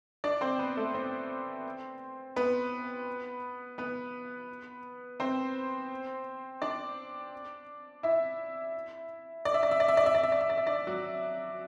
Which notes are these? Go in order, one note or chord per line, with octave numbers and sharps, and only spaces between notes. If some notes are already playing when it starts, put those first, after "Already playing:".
D4 D5
C4 C5
B3 B4
A3 A4
C4 C5
B3 B4
B3 B4
C4 C5
D4 D5
E4 E5
D5
E5
D5
E5
D5
E5
D5
E5
D5
E5
D5
E5
D5
E5
D4 D5
F#3 F#4